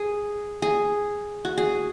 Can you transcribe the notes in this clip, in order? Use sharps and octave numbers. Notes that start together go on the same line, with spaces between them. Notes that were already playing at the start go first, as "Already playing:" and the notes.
Already playing: G#4
G#4
F#4
G#4